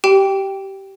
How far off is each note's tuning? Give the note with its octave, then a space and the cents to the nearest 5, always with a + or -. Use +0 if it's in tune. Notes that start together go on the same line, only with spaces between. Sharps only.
G4 -15 G5 +0